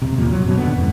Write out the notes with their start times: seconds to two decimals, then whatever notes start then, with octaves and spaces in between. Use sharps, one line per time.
0.02 D#1 C3
0.17 D#2 A#2 F3
0.30 F#3
0.43 F#2 B2
0.58 D#1 D3 B3
0.78 F2 G#2